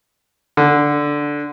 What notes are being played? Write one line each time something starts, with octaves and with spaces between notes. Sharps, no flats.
D3